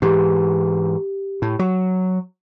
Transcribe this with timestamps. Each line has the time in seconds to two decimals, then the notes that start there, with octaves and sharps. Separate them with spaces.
0.02 G#2 E3 G4
1.42 A2
1.59 F#3